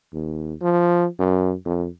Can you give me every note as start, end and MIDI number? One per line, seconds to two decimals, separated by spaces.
0.13 0.54 39
0.62 1.06 53
1.19 1.54 42
1.66 1.88 41